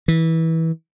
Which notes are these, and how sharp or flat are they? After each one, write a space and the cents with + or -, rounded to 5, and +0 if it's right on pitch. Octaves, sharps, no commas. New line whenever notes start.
E3 -20